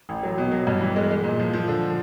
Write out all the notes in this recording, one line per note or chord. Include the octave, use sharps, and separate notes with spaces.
A1
F#3
B2
F#3
G2
E3
G#3
G#3
A#2
F3
F3
D3